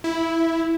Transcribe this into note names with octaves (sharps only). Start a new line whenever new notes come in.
E4